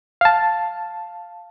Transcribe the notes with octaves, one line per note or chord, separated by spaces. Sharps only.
F5 A5